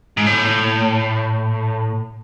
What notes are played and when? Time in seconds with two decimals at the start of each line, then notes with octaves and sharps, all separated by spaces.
0.17 G#2
0.26 A2